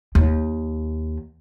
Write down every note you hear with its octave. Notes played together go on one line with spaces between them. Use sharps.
D#2